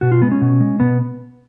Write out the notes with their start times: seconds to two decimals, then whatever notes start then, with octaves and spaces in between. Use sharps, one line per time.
0.01 B2 F#4
0.12 F4
0.22 G#3 B3
0.32 C#4
0.42 B2
0.60 G#3
0.80 B2 B3